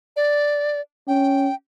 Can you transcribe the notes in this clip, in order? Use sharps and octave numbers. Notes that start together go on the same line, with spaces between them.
D5
C#4 G5